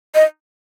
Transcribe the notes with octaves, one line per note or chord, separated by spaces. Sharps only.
D#5